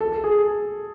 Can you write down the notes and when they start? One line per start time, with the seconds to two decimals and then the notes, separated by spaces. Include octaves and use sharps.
0.01 A4
0.12 A4
0.24 G#4